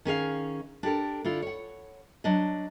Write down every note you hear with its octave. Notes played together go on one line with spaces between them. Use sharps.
D#3 C#4 G#4 F5
D4 G4 A4 A#4
D3 E4 F4
C#5 F#5
F#3 D4 D#5